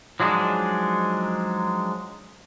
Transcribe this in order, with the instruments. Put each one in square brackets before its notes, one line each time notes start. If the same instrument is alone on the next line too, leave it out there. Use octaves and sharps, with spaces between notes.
[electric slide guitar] F3 F#3 G#3 D4 D#4